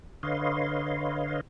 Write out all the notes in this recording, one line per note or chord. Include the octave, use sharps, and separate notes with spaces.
D3 B4 C#5 D#5 F5 C6